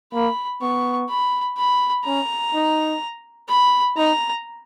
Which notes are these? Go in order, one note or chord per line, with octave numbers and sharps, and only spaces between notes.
A#3 B5
B3 C#6
B5
B5
C#4 A#5
D#4
B5
D#4 A#5